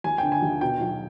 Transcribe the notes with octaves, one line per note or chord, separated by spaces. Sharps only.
D#2 G#5
D3 G5
G#5
D#2
B2 G5
B1